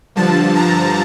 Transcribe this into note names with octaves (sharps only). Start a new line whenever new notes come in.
G2 D3 F3 A5
A#5